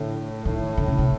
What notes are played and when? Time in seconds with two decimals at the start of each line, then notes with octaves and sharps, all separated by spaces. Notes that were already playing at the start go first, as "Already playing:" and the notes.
Already playing: A2 D3
0.45 A2 D#3
0.77 D3
0.88 C#3
0.98 C3